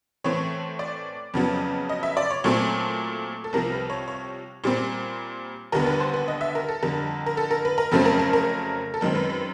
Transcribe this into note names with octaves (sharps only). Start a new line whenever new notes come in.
A2 E3 A3 C4 C#5
D5
F2 C#3 F#3 B3
D#5
E5
D5
C#5
A#2 F#3 A3 C4
A4
C2 C3 F3 A#4
B4
C#5
C#5
A#2 G3 C4
D#2 D3 G3 B3 A#4
B4
C5
B4
D#5
E5
A#4
A4
F2 D3 G3 A#4
A#4
A4
A#4
B4
A#4
F2 C#3 F#3 A3 C4 A4
A#4
A#4
A#4
A4
F#2 D#3 G#3 C4 A#4
B4
B4